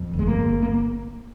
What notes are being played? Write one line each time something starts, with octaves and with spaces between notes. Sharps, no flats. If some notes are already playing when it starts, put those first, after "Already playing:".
Already playing: F2
G1
G#3
A#3
G1
A#3